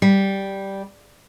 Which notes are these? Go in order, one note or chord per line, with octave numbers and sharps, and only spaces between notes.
G3